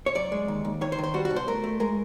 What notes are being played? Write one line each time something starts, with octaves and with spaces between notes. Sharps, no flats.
C#5
F#2 D5
G#3
D#2
D#2
D#3 C#5
C5
D#3
C5
G3 F#4
F#4
B2
C5
A3 A#4
A3
G#3 A#4